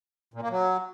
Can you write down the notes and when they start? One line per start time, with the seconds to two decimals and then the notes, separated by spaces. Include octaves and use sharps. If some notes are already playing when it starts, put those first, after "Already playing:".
0.34 A#2
0.42 A#3
0.50 F#3